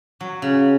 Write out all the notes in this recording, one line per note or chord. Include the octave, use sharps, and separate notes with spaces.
F#3
C#3